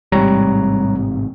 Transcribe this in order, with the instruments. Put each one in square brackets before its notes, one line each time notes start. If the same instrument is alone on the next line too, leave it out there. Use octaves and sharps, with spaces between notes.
[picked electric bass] A1 G#2 C3 [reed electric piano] G3 C#5 A#5